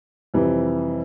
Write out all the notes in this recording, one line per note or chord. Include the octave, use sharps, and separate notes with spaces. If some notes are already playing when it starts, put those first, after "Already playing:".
F2 C3 E3 G3